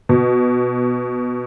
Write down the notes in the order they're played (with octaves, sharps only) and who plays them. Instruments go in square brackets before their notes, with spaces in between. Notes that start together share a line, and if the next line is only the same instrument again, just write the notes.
[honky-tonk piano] B2